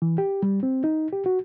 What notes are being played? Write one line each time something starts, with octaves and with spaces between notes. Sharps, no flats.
E3
G4
G3
C4
D#4
G4
F#4